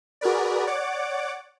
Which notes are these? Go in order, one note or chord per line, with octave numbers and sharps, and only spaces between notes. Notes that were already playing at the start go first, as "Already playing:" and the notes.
F#4 G#4 A#4 B4 D5
C#5 D5 F#5 D6